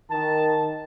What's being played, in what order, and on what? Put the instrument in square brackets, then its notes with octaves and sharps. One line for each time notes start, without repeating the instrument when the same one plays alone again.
[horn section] D#3 A5